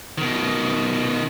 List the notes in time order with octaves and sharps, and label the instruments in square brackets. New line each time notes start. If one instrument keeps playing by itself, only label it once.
[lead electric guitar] B2 D#3